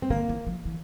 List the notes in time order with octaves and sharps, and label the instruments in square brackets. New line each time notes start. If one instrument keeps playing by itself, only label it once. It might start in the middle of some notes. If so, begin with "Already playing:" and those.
[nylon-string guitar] C4
[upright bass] D3 [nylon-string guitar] A#3
[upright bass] E3
F3
E3